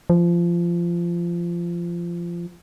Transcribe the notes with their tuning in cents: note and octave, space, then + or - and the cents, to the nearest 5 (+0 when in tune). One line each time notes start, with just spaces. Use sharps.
F3 -20